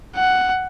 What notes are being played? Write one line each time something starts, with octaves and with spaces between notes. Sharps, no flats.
F#5